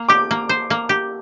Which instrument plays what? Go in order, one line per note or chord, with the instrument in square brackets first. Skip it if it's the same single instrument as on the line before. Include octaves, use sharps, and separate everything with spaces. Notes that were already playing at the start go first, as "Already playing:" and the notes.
Already playing: [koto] A#3
[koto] G4 [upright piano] D6
[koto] A#3
C5
A#3
G4